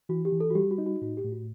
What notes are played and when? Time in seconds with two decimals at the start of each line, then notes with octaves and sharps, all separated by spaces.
0.09 E3 F#4
0.25 G4
0.32 E3
0.40 A4
0.50 F#4
0.55 G3 G4
0.71 F#4
0.78 D#4
0.86 F#4
1.02 A2 F#4
1.17 G4
1.24 A2
1.32 F#4